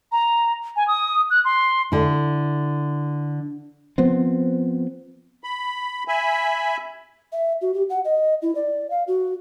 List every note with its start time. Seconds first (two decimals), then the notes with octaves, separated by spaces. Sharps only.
0.12 A#5
0.76 G#5
0.88 D#6
1.30 F#6
1.45 C6
1.92 D3 E4
3.98 F3 B3 C4
5.44 B5
6.08 E5 G#5 B5
7.32 E5
7.61 F#4
7.74 G4
7.90 F#5
8.05 D#5
8.42 E4
8.55 D5
8.90 F5
9.08 F#4